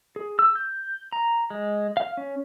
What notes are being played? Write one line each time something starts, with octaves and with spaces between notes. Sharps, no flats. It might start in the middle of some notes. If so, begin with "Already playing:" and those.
G#4
E6
G6
A#5
G#3
F5
C#4